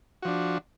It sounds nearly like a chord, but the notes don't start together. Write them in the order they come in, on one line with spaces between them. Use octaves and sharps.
F#4 F3 D4